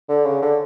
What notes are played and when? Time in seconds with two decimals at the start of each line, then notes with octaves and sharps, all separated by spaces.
0.09 D3
0.25 C#3
0.42 D3